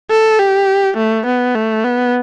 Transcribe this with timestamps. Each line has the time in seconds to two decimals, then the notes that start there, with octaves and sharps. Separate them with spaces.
0.10 A4
0.39 G4
0.97 A3
1.26 B3
1.55 A3
1.85 B3